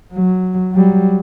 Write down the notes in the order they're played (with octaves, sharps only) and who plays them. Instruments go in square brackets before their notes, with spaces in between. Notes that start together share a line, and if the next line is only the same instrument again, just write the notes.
[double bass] F#3
F#3 G3